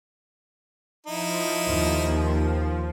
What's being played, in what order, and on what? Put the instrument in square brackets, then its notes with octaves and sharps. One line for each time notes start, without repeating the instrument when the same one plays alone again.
[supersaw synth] F3 [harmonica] D#4 E4
[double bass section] D#2